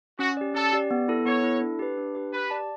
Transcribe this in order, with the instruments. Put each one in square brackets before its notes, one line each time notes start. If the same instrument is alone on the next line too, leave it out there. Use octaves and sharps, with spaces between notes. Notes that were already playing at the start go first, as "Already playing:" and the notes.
[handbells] C#4 [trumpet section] F#4
[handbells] G4 D5
[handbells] C#4 [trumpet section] A4
[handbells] G4 D5
B3
E4 A4
[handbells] B3 [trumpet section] C#5
[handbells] E4 A4
D4
G4 B4
D4
G4 B4
[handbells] G4 [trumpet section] B4
[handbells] D5 A5